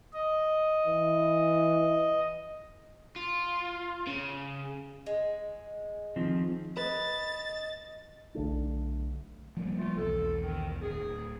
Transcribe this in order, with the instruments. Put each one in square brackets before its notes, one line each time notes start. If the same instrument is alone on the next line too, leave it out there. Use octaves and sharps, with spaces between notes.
[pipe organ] D#5
[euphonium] E3
[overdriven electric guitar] F4
C#3
[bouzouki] G#3
[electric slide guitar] D#3 F3 C4
[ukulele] B4 [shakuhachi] D#5 [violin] A6
[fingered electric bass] B1 D3 A3 D4
F3 G3 A#3
[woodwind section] A3 F4
[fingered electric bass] B1 E2 [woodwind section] A4
[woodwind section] D#3
[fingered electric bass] D1 [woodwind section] G#4